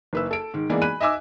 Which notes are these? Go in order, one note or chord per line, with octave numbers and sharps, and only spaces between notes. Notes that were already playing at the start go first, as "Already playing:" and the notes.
F#1 B4 E6
A4 D7
G#2 D#3
G#2 E3 G#3 A#3 B3 D5
G#5 B5 F#6 D#7
D#5 E5 G#5 D6 E6